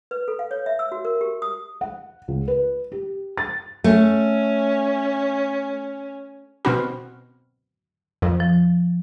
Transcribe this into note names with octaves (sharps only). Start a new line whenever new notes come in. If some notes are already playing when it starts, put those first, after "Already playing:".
B4
A4
F5
C#5
E5
E6
F#4
A#4
G4
D#6
F#5
C#2
B4
G4
A6
A3 C#4
B2 C4 F#4 B5 F6
F2
F3